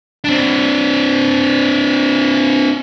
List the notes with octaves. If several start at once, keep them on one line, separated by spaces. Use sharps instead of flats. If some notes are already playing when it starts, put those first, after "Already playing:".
C4 D4